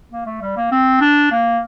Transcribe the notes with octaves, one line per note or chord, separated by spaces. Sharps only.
A#3
A3
G3
A#3
C4
D4
A#3